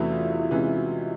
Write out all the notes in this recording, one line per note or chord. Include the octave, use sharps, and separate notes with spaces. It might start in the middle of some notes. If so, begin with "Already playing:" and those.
Already playing: E2 C3 E3 A3 C#4 E4 F#4
F4
F4
E4
C3 E3 G#3 C#4 F4
F#4